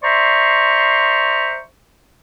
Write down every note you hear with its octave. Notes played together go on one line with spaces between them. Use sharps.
C5 D5 E5 A#5 C6 C#6